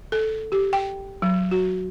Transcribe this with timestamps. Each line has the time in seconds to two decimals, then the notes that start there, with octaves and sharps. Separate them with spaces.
0.12 A4
0.52 G4
0.73 G5
1.22 F#3
1.51 F#4